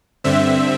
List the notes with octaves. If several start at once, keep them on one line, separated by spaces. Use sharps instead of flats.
G2 D3 C4 E5